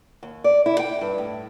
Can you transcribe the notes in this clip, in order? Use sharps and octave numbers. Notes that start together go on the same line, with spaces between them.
D#2
D5
E4
G5
G2
A2